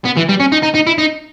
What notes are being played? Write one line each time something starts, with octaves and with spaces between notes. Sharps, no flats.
B3
E3
G3
C#4
D#4
D#4
D#4
E4
D#4